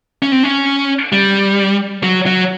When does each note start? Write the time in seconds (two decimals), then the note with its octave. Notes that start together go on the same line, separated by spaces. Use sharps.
0.22 C#4
0.32 C4
0.43 C#4
1.12 G3
2.03 F#3
2.26 F#3